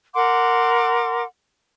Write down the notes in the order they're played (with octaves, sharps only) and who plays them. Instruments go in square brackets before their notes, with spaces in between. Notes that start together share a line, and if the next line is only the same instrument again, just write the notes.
[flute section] A#4 F#5 C6 D6